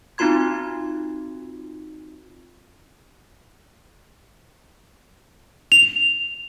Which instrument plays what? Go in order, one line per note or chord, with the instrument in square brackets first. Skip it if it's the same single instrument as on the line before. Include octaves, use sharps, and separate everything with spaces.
[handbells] C4 D#4 F4 F#4 C6 G#6
[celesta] F7